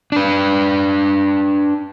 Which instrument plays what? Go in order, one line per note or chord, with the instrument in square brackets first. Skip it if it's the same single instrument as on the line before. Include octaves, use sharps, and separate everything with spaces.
[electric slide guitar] D4 B4